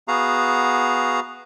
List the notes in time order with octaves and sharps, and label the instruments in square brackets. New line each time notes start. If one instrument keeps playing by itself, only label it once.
[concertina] B3 F#4 G#4 F5 A#5